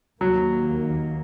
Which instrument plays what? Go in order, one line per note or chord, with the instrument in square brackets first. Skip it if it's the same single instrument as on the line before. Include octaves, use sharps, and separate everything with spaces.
[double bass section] D#2 D#3 A#3 [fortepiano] F#3